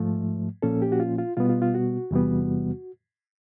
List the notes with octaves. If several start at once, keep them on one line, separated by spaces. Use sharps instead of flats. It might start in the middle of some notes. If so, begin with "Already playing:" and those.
Already playing: G#2 F3 A3
A#2 F3 A#3 C#4 A4
G4
F#4
F4
F4
B2 G3 B3 F4
F4
F4
F#4
E2 C3 E3 G3 B3